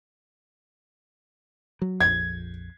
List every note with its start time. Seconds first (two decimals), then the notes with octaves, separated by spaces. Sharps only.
1.82 F#3
2.01 A#1 F2 G#6